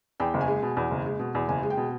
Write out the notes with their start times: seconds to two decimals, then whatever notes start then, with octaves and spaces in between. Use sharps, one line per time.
0.20 E2 G5
0.34 F#1
0.41 G#5
0.48 G#3
0.62 B2
0.77 E2
0.91 F#1
1.06 G#3
1.19 B2
1.35 E2
1.48 F#1 G#5
1.63 G#3
1.70 G5
1.77 B2